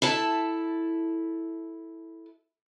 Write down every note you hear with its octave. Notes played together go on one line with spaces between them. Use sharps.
E4 A4 A5